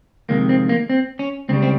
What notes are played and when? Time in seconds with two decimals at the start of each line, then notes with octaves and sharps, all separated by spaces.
0.29 F2 C3 D#3 G#3 A#3
0.49 C4
0.69 A#3
0.90 C4
1.19 C#4
1.49 C#2 C#3 G3 C4
1.62 C4